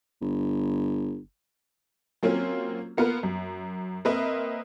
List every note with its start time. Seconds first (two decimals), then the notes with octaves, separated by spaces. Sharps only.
0.21 G1
2.23 F#3 A#3 C4 C#4 F4
2.97 A#3 B3 F4 A#4 B4
3.23 F#2
4.05 A#3 C4 A#4 B4 D#5 E5